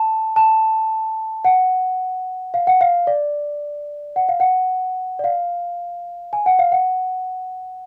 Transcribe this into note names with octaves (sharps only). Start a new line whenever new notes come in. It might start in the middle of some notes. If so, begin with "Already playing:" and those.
Already playing: A5
A5
F#5
F5
F#5
F5
D5
F#5
F5
F#5
D5
F5
G#5
F#5
F5
F#5